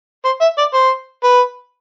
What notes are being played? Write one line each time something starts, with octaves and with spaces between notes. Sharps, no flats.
C5
E5
D5
C5
B4